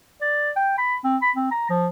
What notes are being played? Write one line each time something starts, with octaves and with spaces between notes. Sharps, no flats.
D5
G5
B5
C4
B5
C4
A#5
F3